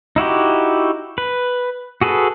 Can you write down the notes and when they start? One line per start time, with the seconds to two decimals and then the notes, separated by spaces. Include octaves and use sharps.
0.16 D#4 E4 F#4 G4
1.18 B4
2.01 F#4 G#4 A4 B4